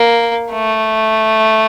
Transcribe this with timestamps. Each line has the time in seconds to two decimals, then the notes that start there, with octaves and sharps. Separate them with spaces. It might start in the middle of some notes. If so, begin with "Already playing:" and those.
Already playing: A#3
0.52 A3